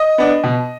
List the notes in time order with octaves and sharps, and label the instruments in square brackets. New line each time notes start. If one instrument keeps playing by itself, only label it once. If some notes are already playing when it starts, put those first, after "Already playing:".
Already playing: [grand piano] D#5 D#6
B3 D4
B2